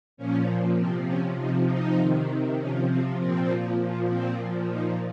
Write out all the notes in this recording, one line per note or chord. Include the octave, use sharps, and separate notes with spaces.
A#2 F3 C#4
C3 F3 C4
C#4
C3 F3 D#4
D#4
C3 D#3
C3 F3 C#4
C4
A#2 F3 C4
A#2 F3
C4
A#2 F3
D#4